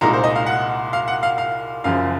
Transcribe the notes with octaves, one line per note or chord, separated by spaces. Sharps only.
C2 A#2 G#3 D#4 A#4
C5
D#5
F5
F#5
F5
F#5
F5
F5
F#1 F#2 C#3 F3 F5